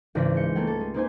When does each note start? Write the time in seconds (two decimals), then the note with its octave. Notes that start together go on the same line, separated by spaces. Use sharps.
0.15 G#1 C#2 E3 D5 A#6 B6
0.35 G#3 G6 C#7
0.55 A3 A#3 G#4 G5
0.67 A4
0.80 G#3
0.94 A#3 C4 D#4 B4 C5 G#5